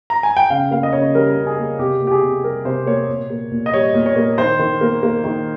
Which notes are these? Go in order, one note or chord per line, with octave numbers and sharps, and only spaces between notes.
A#5
G#5
G5
C#3 F5
A#3 F5
D#5
C#3 C#5
G3 A#4
C#3
G#4
A#3
C3 G4
A#3
G4
G#4
C3
G3 A#4
C3 C5
A#3 C#5
A#2
A#3
A#2
D#5
G3 C#5
A#2
C#5
A#3
D#3 C5
D#3
A#3
A#3
D#3